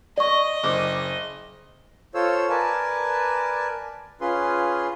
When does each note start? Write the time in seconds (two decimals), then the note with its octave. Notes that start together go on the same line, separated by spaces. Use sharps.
0.18 D5 D#5 C#6
0.63 F#1 D6
2.14 F4 A4 C5 C#5 E6
2.50 A#4 B4 D5 G#5 A5
4.21 C#4 F4 G#4 B4 C6